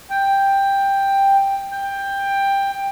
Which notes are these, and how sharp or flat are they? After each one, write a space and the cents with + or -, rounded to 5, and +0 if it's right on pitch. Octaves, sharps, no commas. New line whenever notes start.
G5 +10
G5 +15